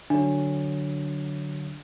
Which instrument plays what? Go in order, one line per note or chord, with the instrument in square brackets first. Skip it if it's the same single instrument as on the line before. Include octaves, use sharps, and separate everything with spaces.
[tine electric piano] D3 F#3 [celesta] D4